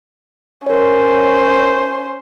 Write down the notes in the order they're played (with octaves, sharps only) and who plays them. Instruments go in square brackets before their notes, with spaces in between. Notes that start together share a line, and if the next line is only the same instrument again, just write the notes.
[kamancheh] C#4 C5 [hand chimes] A#4 C#5